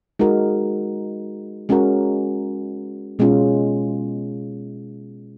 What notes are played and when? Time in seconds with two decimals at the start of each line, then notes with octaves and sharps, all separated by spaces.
0.19 G#3 D#4 F#4 A#4
1.69 G#3 C#4 F#4 A#4
3.19 B2 G#3 C#4 F4